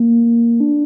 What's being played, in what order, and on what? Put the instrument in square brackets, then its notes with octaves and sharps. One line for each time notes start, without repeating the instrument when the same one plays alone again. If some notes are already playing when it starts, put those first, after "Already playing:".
Already playing: [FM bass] A#3
D4